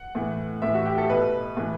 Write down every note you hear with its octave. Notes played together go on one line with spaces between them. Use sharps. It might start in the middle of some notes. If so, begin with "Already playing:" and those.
Already playing: F#5
A2 E3
A2 E3 E5
F#4
G4
A4
B2 B4
A2 E3